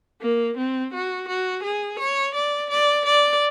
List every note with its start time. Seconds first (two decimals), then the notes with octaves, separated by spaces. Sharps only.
0.21 A#3
0.57 C4
0.93 F#4
1.28 F#4
1.63 G#4
1.99 C#5
2.34 D5
2.70 D5
3.05 D5